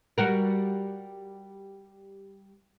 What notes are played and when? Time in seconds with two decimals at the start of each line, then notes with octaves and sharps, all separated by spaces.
0.18 G3 F#4 A#4